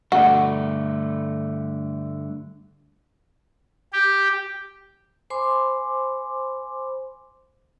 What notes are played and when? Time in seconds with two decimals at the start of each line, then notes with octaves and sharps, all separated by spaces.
0.12 G2 D3 A3 F#4
3.93 G4
5.30 C5 G#5 B5 C6 D6